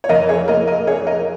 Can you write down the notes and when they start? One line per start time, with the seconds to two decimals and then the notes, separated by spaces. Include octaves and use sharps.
0.04 C#5
0.09 F2 A#4 D#5
0.29 G#4 C#5
0.48 A#3 A#4 D#5
0.67 A#4 D#5
0.87 F2 G#4 C#5
1.07 A#4 D#5